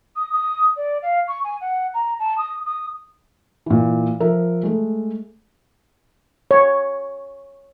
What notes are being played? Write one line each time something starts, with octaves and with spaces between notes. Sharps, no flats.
D#6
D#6
D5
F5
C#6
G#5
F#5
A#5
A5
D#6
D#6
A#2 E3
F3 A#4 E5
G#3 A3
C#5